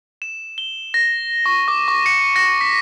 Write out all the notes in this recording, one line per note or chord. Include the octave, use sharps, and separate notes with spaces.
E7
G7
A#6
C#6
D6
C#6
C#7
A#6
B6